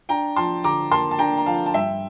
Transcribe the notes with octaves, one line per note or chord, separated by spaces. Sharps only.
D4 G5 A#5
F3 A5 C6
D3 A#5 D6
A#3 A5 C6
A5
D4 G5 A#5
A#5
F3 F5 A5
A5
G2 E5 G5